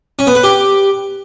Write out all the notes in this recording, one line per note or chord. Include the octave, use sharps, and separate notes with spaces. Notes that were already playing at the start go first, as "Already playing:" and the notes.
C#4
B3
B4
G4